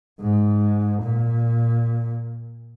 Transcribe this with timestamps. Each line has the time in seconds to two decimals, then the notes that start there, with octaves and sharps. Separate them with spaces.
0.20 G#2
1.02 A#2